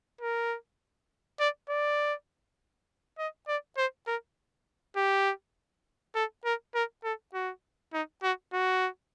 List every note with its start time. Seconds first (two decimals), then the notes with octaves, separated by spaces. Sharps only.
0.21 A#4
1.39 D5
1.69 D5
3.18 D#5
3.48 D5
3.77 C5
4.07 A#4
4.96 G4
6.15 A4
6.45 A#4
6.74 A#4
7.04 A4
7.33 F#4
7.93 D#4
8.23 F#4
8.53 F#4